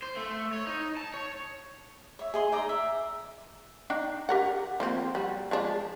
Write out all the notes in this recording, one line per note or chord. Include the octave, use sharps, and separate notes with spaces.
C5
A3
C#5
D#4
A5
C#5
C#5 E5
G#4 D#5 C6
D#4 D5 D#5 A#5
E5
D4 D#4 G5
G4 A#4 F#5
F3 A#3 C4
G3 F#4
F3 G#3 D4